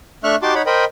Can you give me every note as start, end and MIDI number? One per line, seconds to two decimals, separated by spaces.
0.24 0.36 57
0.24 0.36 62
0.24 0.36 76
0.24 0.36 85
0.24 0.36 89
0.24 0.36 90
0.42 0.54 63
0.42 0.54 66
0.42 0.54 67
0.42 0.54 81
0.42 0.54 84
0.42 0.54 86
0.55 0.62 63
0.55 0.62 73
0.55 0.62 78
0.55 0.62 83
0.66 0.85 70
0.66 0.85 72
0.66 0.85 75
0.66 0.85 79
0.66 0.85 83